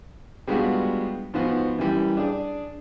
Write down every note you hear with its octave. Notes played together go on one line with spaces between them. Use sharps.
G3 G#3 B3 D4 F4 F#4
G#2 F3 B3 F#4
F#2 E3 G3
D4 G#4 D5